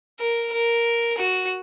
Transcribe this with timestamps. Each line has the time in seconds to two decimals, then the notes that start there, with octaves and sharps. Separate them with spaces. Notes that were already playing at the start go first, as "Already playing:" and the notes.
0.19 A#4
0.52 A#4
1.18 F#4